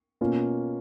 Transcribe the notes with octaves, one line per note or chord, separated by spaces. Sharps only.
B2 A#3 C#4 F4